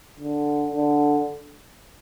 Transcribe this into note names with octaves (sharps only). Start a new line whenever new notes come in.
D3
D3